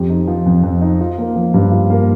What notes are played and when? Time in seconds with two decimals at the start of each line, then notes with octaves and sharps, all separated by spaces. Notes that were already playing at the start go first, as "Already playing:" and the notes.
Already playing: F2 G4
0.10 D#4
0.28 F3
0.46 F2
0.63 F2
0.81 D#4
1.00 F4
1.18 A#3
1.36 F3
1.54 G2
1.71 F4
1.90 A#3